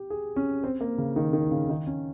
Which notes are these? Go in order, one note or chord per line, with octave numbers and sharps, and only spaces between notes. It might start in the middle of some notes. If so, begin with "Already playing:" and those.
Already playing: G4
G#4
C#4
C4
A#3
C#3
D#3
D#3
C#3
D#3
C#4